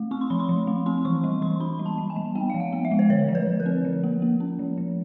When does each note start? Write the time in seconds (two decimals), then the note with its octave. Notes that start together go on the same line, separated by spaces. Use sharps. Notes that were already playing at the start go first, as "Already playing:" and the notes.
Already playing: A3
0.11 C4 C#6
0.21 C6
0.30 F3 B5
0.40 C6
0.49 F3
0.67 A3
0.86 C4 C6
1.05 E3 C#6
1.24 G3
1.42 E3 C6
1.60 D4 B5
1.79 G3
1.86 A5
1.98 G3
2.10 G#5
2.16 G3
2.35 B3 G5
2.50 F3 F5
2.60 F#5
2.73 B3
2.85 E5
2.91 G#3
2.99 C5
3.10 D3 C#5
3.29 F3
3.35 B4
3.47 F3
3.60 A#4
3.66 C4
3.85 F3
4.04 A#3
4.22 A#3
4.40 C#4
4.59 F3
4.78 F3